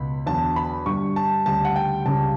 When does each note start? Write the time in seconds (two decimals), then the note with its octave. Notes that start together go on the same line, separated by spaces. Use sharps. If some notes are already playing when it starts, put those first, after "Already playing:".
Already playing: C#2 B2 B5
0.26 E2 D3 F#3 A5
0.56 B5
0.86 G2 D3 G3 C#6
1.16 A5
1.46 D2 C#3 G3 A5
1.65 F#5
1.76 G5
2.06 C#2 C#3 G3 A5